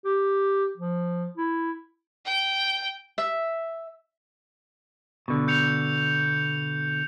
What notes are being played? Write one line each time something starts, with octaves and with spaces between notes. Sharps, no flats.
G4
F3
E4
G5
E5
B2 D3
G6 C#7 F7